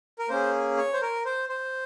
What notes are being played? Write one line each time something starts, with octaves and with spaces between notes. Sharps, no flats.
A#4
A#3 C#4 G#4 C5
C#5
C5
A#4
C5
C5